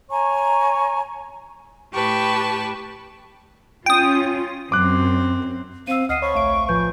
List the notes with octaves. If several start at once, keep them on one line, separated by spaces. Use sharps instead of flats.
C#5 G#5 A#5 C#6
A2 G4 B4 A5 C#6
C#4 F4 G5 D#6
F#2 C4 D6 F#6
C4 F5 E6 D#7
D2 D#5 F#5 F6 C7 D#7
C5 C#5 A5 B5 C#6
A#1 A3 E5 F5 D7
A2 F3 B4 G#5 G6